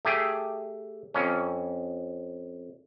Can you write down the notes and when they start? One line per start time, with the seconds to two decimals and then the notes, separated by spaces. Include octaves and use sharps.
0.05 A3 G4 G#4
1.14 F2 C#4